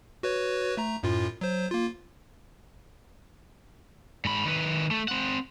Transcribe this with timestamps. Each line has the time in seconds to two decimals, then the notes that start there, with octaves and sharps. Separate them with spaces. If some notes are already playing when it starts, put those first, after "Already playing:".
0.23 F#4 B4 C#5
0.77 A3 A#5
1.03 F#2 A2 F4
1.41 F#3 C5
1.71 A#3 F4
4.25 G#2 B5
4.46 D#3 B4
4.91 A3
5.08 C4 F#5